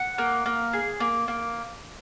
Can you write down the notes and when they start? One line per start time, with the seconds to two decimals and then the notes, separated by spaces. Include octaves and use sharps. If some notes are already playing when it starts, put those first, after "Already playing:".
Already playing: F#5
0.18 A#3
0.46 A#3
0.73 G#4
1.00 A#3
1.28 A#3